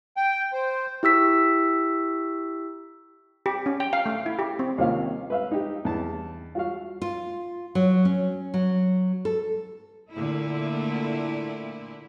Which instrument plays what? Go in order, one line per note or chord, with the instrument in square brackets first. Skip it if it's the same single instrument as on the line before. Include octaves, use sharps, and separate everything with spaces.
[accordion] G5
C5
[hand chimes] E4 G4 E6 B6
[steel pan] G4
C#4
G5
F5
A3
E4
G4
C4
[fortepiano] D#2 C3 C4 C#4 F4 F5
B4 E5 F5
D#4 G4
E2 A5
F4 F#4 F5
[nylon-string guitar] F4
F#3
C#4
F#3
A4
[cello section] A#2 D3 A3 E4